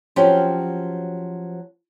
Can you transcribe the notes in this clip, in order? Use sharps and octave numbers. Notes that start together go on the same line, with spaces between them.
F3 F#3 C4 C#4 G4